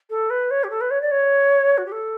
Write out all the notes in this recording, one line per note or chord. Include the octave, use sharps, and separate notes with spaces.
A4
B4
C#5
G4
A4
B4
C#5
D5
C#5
F#4
G4
A4